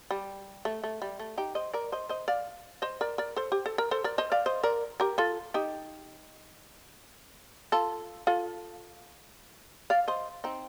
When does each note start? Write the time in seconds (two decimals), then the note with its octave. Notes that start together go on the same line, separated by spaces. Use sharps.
0.11 G3
0.65 A3
0.84 A3
1.02 G3
1.19 A3
1.38 D#4 G4
1.55 C5 D#5
1.74 A#4 D5
1.92 C5 D#5
2.09 C5 D#5
2.28 D5 F5
2.82 C5 D#5
3.01 A#4 D5
3.18 A#4 D5
3.36 A4 C5
3.52 G4
3.66 A4
3.78 A#4
3.91 A4 C5
4.04 A#4 D5
4.18 C5 D#5
4.32 D5 F5
4.46 C5 D#5
4.63 A#4 D5
5.00 G4 A#4
5.18 F4 A4
5.54 D#4 G4
7.72 F4 A4
8.27 F4 A4
9.90 D5 F5
10.08 C5 D#5
10.44 C4 D#4